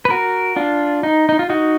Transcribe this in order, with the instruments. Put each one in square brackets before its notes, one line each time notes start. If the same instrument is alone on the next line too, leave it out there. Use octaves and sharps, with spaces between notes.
[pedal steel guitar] B4
F#4 A#4
D4 F4
D#4
D#4
F4
D#4 F#4